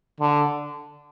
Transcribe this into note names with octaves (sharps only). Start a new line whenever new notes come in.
D3